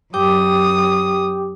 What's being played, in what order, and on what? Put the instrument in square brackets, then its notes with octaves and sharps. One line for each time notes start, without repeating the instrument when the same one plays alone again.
[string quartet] F#2 D#6 [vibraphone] G4 G5 D6